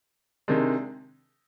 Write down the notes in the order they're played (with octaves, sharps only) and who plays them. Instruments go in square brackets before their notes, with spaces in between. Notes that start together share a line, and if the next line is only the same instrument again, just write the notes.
[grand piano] C3 D#3 G#3 D4